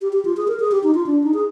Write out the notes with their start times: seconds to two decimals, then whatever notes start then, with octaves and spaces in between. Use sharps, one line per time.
0.01 G4
0.13 G4
0.25 F4
0.37 G#4
0.48 A#4
0.60 G#4
0.72 G4
0.83 D#4
0.94 F4
1.06 D4
1.24 D#4
1.34 G#4